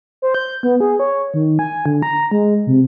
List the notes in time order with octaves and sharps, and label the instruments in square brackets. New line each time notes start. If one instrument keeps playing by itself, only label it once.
[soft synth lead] C5
G6
B3
G#4
C#5
D#3
G#5
D3
A#5
G#3
C3